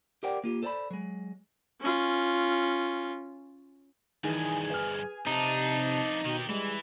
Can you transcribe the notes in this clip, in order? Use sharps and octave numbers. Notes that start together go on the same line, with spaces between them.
G4 A#4 C5 D5 F#5 G5
A#3 F4 G4
A4 C5 D5 A5 B5
F#3 G#3
C#4 F4
D2 G2 D#3 E3 G#4 G#5
B4 F6
F2 C3 D4 D#4 A5
B2 D#3 G4
E3 G3 G#3